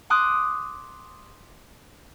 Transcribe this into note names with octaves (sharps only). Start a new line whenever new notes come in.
C6 D6 D#6 F#6